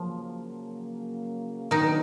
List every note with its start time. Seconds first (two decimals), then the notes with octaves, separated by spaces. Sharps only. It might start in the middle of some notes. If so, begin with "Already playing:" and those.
Already playing: C#3 F3 F#3 A#3
1.71 D3 D#3 F#3 B3 D#4